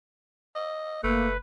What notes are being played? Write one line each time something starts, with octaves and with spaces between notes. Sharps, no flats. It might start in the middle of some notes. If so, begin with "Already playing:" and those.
D#5
F#1 A3 A#3 B4